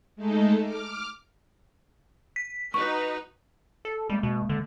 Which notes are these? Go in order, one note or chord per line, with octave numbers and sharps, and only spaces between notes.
G#3 A3 D#4 A4
D6 F6
B6
D#4 F#4 B4 C#6
A4
G3 G#3 A#3
B2
D3